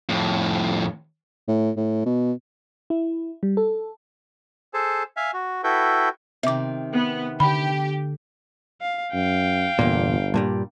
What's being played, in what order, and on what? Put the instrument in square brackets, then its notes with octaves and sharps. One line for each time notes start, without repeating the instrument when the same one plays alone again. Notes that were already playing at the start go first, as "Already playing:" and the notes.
[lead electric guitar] F2 A2
[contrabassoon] A2
A2
B2
[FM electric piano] E4
G3
A4
[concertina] G#4 A4 C5 A5
E5 F5 G#5
F#4
E4 F#4 A4 B4 G5
[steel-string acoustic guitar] C3 D#3 [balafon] E5 D6
[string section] B3
[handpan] D3 [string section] G4 [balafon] B5
[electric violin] F5
[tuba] F#2 [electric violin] F5 G5
[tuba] G1 [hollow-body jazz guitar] E2 A#2
[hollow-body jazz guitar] G2 A#2 G3